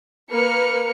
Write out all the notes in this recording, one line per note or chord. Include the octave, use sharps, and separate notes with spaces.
A#3 A#4 B4 F6 C#7